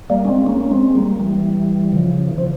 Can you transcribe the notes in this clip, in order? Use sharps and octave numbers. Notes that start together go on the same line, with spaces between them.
G3 A#3
C#4
G#3 C4
C4
A#3 C#4
C#4
G#3 C4
G3 A#3
E3 G3
C#3 F3
E3
F3